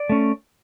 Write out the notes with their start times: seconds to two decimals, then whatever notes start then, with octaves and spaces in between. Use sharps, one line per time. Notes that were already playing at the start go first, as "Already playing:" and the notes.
Already playing: D5
0.09 A3 C#4